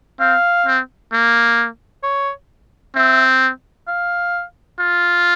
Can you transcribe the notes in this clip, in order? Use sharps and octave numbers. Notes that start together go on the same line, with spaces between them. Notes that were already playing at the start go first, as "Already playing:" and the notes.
C4 F5
C4
A#3
C#5
C4 E5
F5
F4